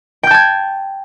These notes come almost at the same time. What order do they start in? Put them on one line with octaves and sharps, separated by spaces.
G5 G6 A5 G#6